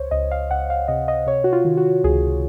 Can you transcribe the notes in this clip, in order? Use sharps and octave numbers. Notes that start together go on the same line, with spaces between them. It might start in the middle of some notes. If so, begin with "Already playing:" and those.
Already playing: C#2 C5 C#5
C#2 D#5
F5
C#2 F#5
F5
C3 D#5
D#5
C3 C#5
F#4
F4
D#3
F#4
C#2 G#4